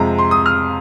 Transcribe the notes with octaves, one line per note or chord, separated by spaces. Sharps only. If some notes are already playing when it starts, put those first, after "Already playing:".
Already playing: F2 C3 G#3 A#5
C6
D#6
F6